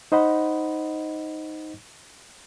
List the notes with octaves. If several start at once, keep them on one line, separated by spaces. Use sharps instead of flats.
D#4 C5 D#5 F#5 B5